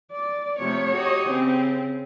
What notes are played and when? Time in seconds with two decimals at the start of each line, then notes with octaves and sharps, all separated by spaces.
0.12 D5
0.59 C3 F3 A3 C#5
0.93 F#4 G4 D#5
1.29 C#3 C4